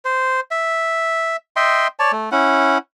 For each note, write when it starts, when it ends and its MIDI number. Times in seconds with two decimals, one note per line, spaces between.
0.05 0.40 72
0.51 1.36 76
1.56 1.87 75
1.56 1.87 76
1.56 1.87 79
1.56 1.87 84
1.99 2.12 73
1.99 2.12 74
1.99 2.12 81
2.12 2.30 57
2.32 2.78 61
2.32 2.78 64
2.32 2.78 78